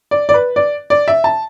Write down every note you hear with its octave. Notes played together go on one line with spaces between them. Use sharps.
D5
D5
B4
D5
D5
E5
A5